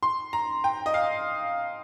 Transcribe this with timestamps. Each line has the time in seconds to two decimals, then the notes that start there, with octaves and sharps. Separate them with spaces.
0.03 C6
0.33 A#5
0.64 G5
0.86 D#5
0.94 F5